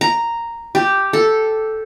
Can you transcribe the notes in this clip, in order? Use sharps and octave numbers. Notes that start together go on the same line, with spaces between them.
A#5
G4
A4